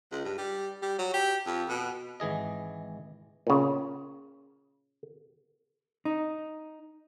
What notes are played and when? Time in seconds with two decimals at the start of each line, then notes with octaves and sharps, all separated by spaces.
0.12 C#2
0.25 G2
0.38 G3
0.82 G3
0.99 F#3
1.14 G4
1.46 F2
1.69 B2
2.20 G#1 E3 G#4 D#5
3.47 A#2 C#3
6.05 D#4